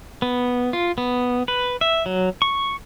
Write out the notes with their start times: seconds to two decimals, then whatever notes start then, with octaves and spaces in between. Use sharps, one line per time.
0.22 B3
0.73 F4
0.98 B3
1.48 B4
1.81 E5
2.06 F#3
2.42 C#6